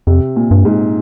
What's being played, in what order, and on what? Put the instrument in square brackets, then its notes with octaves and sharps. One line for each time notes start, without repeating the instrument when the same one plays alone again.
[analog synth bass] F2 [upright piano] C3
[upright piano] A#2
[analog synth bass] G2
[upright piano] G#2